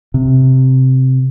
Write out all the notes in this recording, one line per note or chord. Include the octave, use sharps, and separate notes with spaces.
C3